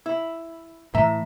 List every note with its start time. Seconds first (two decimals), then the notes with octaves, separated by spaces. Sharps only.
0.06 E4
0.95 A2 E3 E5 A#5